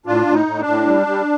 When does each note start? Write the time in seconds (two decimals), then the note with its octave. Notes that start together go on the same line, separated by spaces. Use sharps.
0.06 A2 D4 F4
0.26 A2
0.33 D#4
0.47 A2
0.60 D4
0.66 A2
0.86 G3
1.07 G3